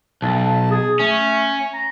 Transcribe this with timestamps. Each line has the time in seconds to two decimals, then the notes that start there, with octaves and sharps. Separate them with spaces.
0.22 B1 A5
0.71 G#4
0.99 A3 C#4
1.73 A#5